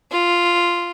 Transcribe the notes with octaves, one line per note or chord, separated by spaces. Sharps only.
F4